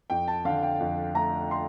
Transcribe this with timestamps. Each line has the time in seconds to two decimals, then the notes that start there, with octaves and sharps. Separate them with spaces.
0.10 F2 G5
0.28 A5
0.45 D3 F5
0.63 G5
0.80 F2
1.15 A3 A#5
1.51 C6